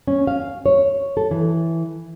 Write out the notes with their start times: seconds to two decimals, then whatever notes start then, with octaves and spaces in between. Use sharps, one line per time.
0.07 C#4
0.27 F5
0.66 C#5
1.17 A4
1.31 E3